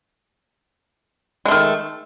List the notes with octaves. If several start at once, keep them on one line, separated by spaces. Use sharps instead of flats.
D#3 G#3 A3